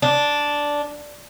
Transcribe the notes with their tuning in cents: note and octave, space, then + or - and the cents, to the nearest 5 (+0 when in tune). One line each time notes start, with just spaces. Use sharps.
D4 -5